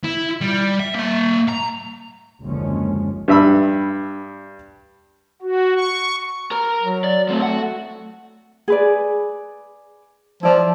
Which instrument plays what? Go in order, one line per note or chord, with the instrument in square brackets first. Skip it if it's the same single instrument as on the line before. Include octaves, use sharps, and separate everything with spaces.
[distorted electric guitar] E4
G3
E5
A#3 E5
A#5
[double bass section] F#1 D#2 D3 F3 G#3 C#4
[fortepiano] G2 E5 B5
[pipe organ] F#4
C#6
[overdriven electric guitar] A#4 A#5
[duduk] F#3
[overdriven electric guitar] D5
[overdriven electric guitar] F#3 C4 [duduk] A3
[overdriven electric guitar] F#4 F#5
[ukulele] G#4 B4 D5
[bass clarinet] F3 [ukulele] E4 D5